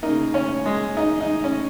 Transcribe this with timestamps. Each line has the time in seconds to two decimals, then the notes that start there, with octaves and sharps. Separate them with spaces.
0.02 C#3 A#3 D#4
0.34 C#4 C#5
0.66 G#3 G#4
0.97 D#4 D#5
1.21 D#4
1.44 C#4